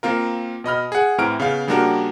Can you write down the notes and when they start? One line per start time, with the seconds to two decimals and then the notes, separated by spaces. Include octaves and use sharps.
0.03 A#3 C4 F4 A#4
0.64 B2 D#5 B5 F6
0.92 G#4 F#5
1.18 A2 E3 C4 A#5 F6 D7
1.40 C#3 B3 F5
1.67 C#3 G3 A#3 D4 F#4 A#4